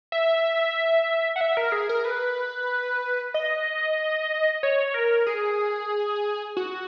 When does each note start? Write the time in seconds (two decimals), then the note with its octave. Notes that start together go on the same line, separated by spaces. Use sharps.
0.12 E5
1.36 F#5
1.41 E5
1.57 A#4
1.72 G#4
1.89 A#4
2.05 B4
3.34 D#5
4.63 C#5
4.94 A#4
5.26 G#4
6.57 F#4